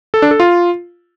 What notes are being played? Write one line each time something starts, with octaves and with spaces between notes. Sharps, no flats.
A4
D4
A4
F4